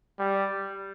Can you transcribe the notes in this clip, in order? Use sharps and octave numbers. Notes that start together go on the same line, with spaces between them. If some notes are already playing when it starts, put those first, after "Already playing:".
G3